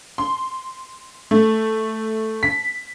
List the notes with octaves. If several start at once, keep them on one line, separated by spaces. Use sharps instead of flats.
C6
A3
B6